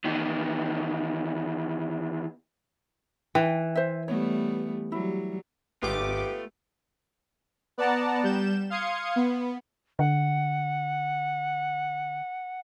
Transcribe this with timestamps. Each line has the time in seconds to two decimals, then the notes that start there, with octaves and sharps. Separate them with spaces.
0.04 E2 D#3
3.35 E3 G5
3.76 C5 E5
4.08 G3 A3 B3 C#5
4.92 F#3 G3 E4
5.83 G#1 A3 B3 F4 G4 D6
7.78 B3 D5 F#5 A5 A#5
8.23 G3 G6 E7
8.70 F5 C6 D#6 G#6 C#7
9.16 B3
9.99 D3 F#5